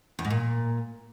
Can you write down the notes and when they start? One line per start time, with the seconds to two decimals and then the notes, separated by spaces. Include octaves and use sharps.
0.19 E2
0.25 G#2
0.30 A#2